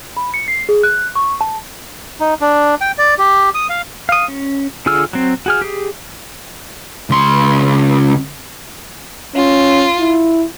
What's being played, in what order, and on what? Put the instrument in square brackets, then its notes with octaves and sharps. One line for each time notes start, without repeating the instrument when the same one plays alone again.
[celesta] B5
C#7
C7
G#4
F#6
C#6
A5
[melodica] D#4
D4
G5
D5
G4
D#6
F5
[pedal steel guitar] F5 D#6
C#4
D3 F4 G#4 E6 F6
F#3 C4
F#4 G#4 F6
G4 G#4
[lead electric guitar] C#2 C6
[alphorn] C#4 [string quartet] F4
[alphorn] E4